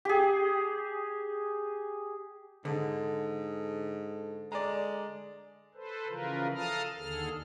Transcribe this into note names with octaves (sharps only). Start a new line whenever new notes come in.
G4 G#4
G#2 D3 A4 A5
G#3 D5 A#5
A4 B4 C5
C#3 E3 F3 F4 A#4 B4
A4 F5 A5 A#5 D#6 F6
D#2 D3 G#4 A4 F6